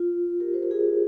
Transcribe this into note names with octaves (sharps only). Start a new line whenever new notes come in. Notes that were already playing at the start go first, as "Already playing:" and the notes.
Already playing: F4
G4 A#4
C5
A#4
F4 G#4